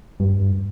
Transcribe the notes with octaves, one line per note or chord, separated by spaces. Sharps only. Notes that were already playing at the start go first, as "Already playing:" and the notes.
G2